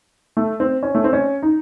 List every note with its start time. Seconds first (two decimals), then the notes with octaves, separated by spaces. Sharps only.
0.37 A3
0.60 C4
0.83 C#4
0.95 A3
1.04 C4
1.13 C#4
1.43 D#4